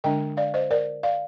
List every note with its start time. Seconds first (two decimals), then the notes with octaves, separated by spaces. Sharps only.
0.04 D3 G#3 D4 D#5 G5
0.37 D5 F5
0.54 C5 D#5
0.71 A#4 D5
1.03 D5 F5